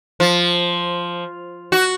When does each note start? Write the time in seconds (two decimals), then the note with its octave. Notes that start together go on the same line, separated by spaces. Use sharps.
0.20 F3
1.72 F#4